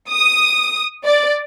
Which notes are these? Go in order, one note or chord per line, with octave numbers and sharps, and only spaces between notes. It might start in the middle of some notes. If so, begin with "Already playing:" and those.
D#6
D5